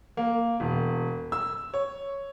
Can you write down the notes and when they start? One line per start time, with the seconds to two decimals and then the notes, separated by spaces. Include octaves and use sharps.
0.17 A#3
0.60 E1
1.32 E6
1.74 C#5